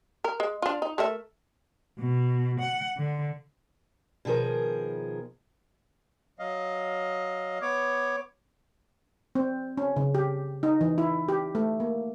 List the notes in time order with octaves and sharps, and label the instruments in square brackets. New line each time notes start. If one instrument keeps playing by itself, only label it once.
[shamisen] A#4
G#3
D4 F4
D#4
A3 A#4 E5
[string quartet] B2
F#5
D3
[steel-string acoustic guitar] B2 D#3 F3 G#4 A#4
[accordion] F#3 D#5 F5
B3 C#5 D6
[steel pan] C4
C#4
C#3
G4
D#4
E3
E4
G4
A3
A#3